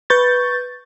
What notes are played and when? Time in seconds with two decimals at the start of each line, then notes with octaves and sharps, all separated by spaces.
0.10 B4 C#6 G6 A6